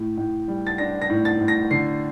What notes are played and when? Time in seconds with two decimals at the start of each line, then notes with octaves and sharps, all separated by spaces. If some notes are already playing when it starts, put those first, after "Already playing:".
Already playing: A2
0.17 A2
0.48 G3
0.67 A6
0.78 D4 A#6
1.02 A#6
1.10 A2
1.25 A6
1.40 A2
1.48 A#6
1.71 D3 C7